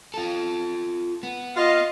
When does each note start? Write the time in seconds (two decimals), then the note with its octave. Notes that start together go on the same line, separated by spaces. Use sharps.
0.14 F4 A4
1.23 B3
1.56 F4 D#5 F5